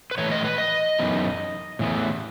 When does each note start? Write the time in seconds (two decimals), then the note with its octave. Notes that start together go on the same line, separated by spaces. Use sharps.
0.11 B4
0.18 A2 E3 A3 C#5
0.31 D#5
0.45 B4
0.58 D#5
0.98 F#2 E3 B3 D#4
1.79 A2 E3 B3